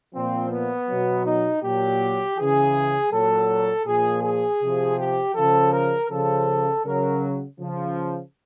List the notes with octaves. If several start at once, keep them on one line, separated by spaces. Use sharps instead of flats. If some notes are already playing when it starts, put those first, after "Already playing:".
A#2 F3 C4
B3
B2 F#3
D#4
A#2 F#3 G4
C#3 E3 G#4
A#2 F#3 A4
A#2 F3 G#4
G#4
C3 F3
G4
C#3 F3 A4
A#4
C#3 F3 A4
C#3 F#3 A#4
C#3 F3